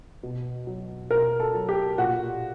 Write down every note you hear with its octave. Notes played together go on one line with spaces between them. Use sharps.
B2
F#3
B2 A#4
A4
F#3
G4
A#2 F#4